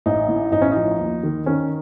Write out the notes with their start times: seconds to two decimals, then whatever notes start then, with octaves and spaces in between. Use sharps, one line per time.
0.06 A1 D#4
0.29 A2
0.52 A1 D#4
0.61 C#4
0.71 D#4
0.76 F3
0.99 D#2
1.23 D#3
1.46 D#3 C#4